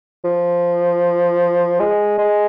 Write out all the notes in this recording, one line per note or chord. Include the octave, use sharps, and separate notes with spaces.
F3
G#3
G#3